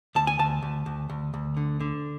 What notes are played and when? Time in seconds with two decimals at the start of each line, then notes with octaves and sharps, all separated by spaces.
0.15 D2 A5
0.27 G#5
0.39 D2 A5
0.62 D2
0.86 D2
1.10 D2
1.34 D2
1.57 D3
1.80 D3